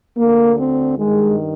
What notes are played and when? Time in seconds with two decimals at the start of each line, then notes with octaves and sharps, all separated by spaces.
0.17 D2 D3 A#3
0.58 C4
0.97 G2 D#3 G#3